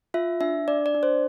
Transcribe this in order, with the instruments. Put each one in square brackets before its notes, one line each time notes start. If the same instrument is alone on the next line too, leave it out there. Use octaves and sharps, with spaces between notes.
[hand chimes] F4 E5
D4 E5
D4 D5
D5
D4
C5